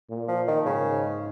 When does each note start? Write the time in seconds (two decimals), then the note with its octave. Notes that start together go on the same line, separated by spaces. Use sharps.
0.10 A#2
0.28 F3
0.48 D#3
0.66 G#2 C#3